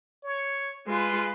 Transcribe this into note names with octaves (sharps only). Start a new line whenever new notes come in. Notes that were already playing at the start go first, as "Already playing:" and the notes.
C#5
G#3 F4 B4